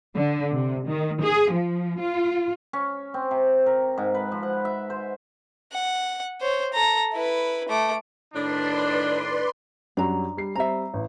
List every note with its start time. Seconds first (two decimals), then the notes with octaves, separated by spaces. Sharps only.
0.15 D3
0.53 C3
0.87 D#3
1.21 G#4
1.52 F3
1.99 F4
2.73 C#4
3.14 C4
3.31 C3
3.66 A#4
3.98 G#2
4.14 B4
4.32 F3
4.43 F#5
4.65 E5
4.90 C5
5.72 F#5
6.41 C5 C#5
6.73 A4 A#5
7.13 E4 B4
7.69 A3 D6
8.34 A2 D#3 D4 B4 D5 C6
9.97 F#2 F#3 G3 D4 A#5
10.37 G3 C7
10.55 G3 C4 E5 A#5
10.93 A1